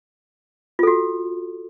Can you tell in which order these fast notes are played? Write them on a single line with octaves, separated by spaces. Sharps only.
F4 A4 F#4